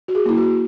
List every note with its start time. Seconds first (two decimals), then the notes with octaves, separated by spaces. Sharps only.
0.08 F#4
0.15 G#4
0.26 A#3 E4
0.37 F#4